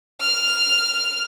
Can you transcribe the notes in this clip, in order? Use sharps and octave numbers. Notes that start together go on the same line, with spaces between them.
F6